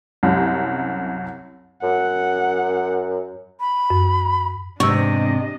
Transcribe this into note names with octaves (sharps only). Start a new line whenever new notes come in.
C2 F#2
F#2 F#5
B5
F#2
E2 G#2 C3 D4 D#5 C#6 E6